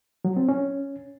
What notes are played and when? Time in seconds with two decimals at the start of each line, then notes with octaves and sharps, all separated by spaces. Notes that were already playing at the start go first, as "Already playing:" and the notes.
0.25 F#3
0.37 C4
0.49 C#4